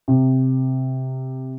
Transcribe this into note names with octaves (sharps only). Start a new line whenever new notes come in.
C3